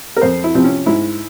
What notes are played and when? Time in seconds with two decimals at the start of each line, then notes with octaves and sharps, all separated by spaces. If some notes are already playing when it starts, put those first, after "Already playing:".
0.17 A#4
0.22 F2 C5
0.44 E4
0.54 C3 F3 C4
0.64 C#4
0.86 G#2 E4